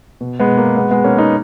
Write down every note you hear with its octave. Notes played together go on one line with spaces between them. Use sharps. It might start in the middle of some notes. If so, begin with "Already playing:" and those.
B2
G#3 B3
B2
A#3
B2 G#3 B3
G#3 B3
B2 A#3 C#4
B3 D#4